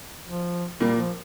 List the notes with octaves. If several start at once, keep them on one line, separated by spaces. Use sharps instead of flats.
F3
A#2 G3 A#3
F3